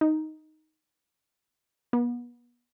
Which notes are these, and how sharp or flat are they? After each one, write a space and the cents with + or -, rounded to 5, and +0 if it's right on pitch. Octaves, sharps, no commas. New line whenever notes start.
D#4 +0
B3 -40